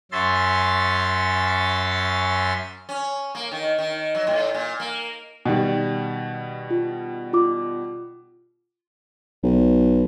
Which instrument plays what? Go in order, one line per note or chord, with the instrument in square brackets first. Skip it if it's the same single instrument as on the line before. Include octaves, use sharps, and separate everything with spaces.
[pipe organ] F#2 C#4 E5 C6 A6
[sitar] C#4
A#3
D#3
D#3
F#3
A2
A#2
A#3
[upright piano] B2 D#3 G3
[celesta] F4
F4 D6
[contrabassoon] B1